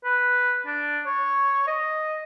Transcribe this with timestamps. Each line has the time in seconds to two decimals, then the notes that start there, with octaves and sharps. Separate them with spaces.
0.05 B4
0.67 D4
1.07 C#5
1.68 D#5